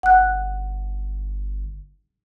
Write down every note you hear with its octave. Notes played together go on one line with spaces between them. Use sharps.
G1 F#5 F#6